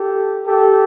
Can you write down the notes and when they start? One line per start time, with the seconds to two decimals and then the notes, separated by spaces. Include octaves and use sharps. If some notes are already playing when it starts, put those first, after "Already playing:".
Already playing: G4 A4
0.45 G4 A4